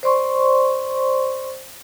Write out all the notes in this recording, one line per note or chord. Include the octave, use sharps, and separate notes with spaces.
C5 D5 C6 C#6